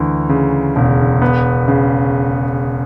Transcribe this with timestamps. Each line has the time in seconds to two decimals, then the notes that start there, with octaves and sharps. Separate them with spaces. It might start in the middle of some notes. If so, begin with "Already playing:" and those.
Already playing: D2 E3
0.29 C#3
0.76 E1
1.22 B3
1.68 C#3